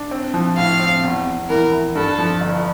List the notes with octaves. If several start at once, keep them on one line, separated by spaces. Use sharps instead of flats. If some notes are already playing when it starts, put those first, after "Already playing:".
Already playing: D4
C4
F3
A2 F5
C4
E2
E2
E3 A#4
E3
G2 A4
F3
G1